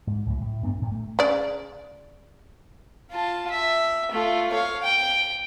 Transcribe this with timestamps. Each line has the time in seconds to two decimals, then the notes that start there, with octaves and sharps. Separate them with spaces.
0.07 G#2
0.26 C#2 A2 F#3
0.40 A2
0.63 G2 B3 C4 D4
0.78 D2 A2
0.92 A3
1.19 C#3 D5
3.11 F4 A5
3.51 E5
4.11 A3 F4
4.52 C#5 F5
4.83 G5